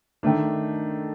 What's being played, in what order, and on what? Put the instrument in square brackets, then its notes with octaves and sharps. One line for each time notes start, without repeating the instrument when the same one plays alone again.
[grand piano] D#3 A3 D4